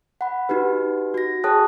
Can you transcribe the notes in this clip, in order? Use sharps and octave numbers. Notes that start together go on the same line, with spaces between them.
F#5 B5
D#4 F#4 G4 B4
F#4 A#6
G#4 C#5 G5 A5 D#6 F#6